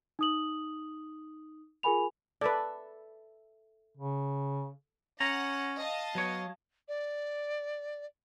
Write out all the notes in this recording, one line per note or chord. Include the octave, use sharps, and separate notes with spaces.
D#4 D#6 F#7
F4 G#4 A#4 G#5 B5 F7
A4 B4 D5 E5
C#3
C#4 F#5 A#5
D#5 F5 A5
F#3 B3 C#5
D5